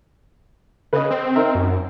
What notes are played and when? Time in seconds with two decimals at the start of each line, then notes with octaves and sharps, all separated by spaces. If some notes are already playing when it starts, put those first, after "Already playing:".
0.93 C#3 B4 D#5
1.11 C4
1.35 D#4 A#4 E5
1.55 F#2